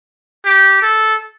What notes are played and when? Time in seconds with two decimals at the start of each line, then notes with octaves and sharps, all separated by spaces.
0.45 G4
0.82 A4